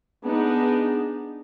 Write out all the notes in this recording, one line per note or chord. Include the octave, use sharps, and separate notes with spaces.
B3 D4 D#4 G#4